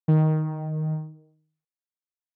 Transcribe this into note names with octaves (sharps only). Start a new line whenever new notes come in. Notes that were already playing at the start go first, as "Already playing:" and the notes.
D#3